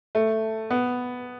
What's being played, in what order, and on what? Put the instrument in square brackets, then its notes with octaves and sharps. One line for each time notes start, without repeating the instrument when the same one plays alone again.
[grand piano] A3
B3